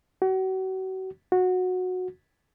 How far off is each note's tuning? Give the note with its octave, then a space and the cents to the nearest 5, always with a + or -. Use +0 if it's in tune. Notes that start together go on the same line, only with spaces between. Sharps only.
F#4 +35
F#4 -15